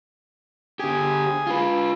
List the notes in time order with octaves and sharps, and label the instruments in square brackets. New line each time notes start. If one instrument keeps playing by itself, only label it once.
[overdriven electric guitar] D3 G4 [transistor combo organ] G#4
[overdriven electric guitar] F4 B4